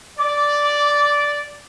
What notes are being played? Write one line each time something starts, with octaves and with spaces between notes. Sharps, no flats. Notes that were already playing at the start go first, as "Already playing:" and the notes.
D5 D6